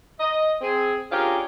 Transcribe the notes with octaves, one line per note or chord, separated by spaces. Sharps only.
D#5
C4 G#4
C#4 D4 F4 G4 G#4 A#4